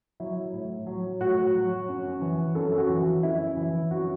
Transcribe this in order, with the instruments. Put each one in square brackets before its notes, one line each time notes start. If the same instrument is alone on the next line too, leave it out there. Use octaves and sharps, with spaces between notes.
[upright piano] F#3 E4
A2
F#3
A2 F#4
F#3
F#2
E3
F#2 A4
F#4
E3
F#2 E4
E3
F#2 F#4